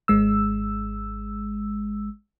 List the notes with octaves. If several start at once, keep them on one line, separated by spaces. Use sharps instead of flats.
G#1 G#3 E6